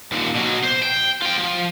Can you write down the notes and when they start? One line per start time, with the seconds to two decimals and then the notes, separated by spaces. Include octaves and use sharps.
0.12 D#2 A#2
0.35 B2 F#3
0.64 C5
0.83 G5
1.22 F4 G5
1.38 F3